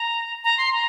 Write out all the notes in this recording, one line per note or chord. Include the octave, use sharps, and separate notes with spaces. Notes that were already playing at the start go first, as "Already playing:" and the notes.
Already playing: A#5
A#5
C6
A#5